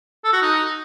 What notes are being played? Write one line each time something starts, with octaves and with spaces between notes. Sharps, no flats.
A4
F#4
D#4